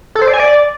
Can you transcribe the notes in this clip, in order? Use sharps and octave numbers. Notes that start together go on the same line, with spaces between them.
A4
C5
D5
G#5
D5